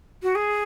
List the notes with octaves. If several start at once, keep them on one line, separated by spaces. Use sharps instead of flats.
F#4
G#4